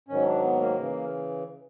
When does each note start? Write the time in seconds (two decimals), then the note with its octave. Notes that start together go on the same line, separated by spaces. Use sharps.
0.08 G#2 D#3 F#3 C#4
0.26 D4
0.42 B3
0.60 A#3
0.77 C#3 E3